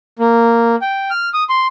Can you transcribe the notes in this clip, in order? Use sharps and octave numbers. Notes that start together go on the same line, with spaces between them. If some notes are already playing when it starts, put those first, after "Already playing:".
A#3
G5
F6
D#6
C6